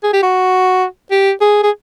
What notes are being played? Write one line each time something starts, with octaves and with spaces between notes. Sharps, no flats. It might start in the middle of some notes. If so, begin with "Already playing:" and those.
G#4
G4
F#4
G4
G#4
G#4